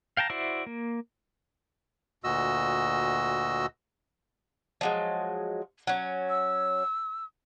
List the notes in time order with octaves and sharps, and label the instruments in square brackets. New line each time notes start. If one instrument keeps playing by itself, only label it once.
[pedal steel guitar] F5 G5 A5 A#5
E4 F#4 C5 D5 E5
A#3
[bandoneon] D2 A#2 F#4 D#5 E6
[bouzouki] F3 F#3 G#3
F#3 C#4
[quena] E6